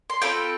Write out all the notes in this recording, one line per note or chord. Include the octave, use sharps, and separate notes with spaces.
C6
C4 F4 A4 G5 B5